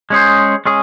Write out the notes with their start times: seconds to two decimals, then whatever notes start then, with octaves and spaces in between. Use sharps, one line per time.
0.10 G#3 C#4 G#4 C5
0.66 G#3 C#4 G#4